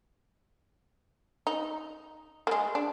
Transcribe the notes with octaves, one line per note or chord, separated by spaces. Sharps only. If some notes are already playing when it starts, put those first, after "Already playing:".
D#4
G#3 A#3
D4